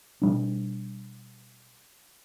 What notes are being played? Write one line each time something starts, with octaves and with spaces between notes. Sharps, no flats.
B2 G3 D4